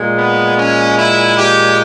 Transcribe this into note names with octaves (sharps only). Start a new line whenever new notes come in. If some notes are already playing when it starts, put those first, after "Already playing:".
Already playing: A#2 G#3
B3
C#4
E4
G4